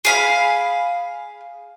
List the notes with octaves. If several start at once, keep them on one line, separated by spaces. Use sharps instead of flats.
G#4 F5 B5